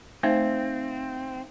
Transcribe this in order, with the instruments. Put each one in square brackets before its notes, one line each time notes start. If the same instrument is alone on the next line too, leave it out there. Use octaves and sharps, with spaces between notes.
[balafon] A3 C5 [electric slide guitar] C4 [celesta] D#4 E5 F5